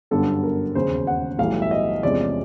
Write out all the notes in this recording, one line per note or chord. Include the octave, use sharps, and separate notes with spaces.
G1 F#2 D3 G3 B3 A4
A#4
E1 D#2 C#3 C5
F#5
B1 A2 E3 G3 F5
E5
D#5
E2 C3 F3 G#3 C#4 D5